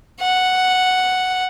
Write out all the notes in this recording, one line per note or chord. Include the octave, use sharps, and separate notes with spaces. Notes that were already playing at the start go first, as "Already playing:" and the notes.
F#5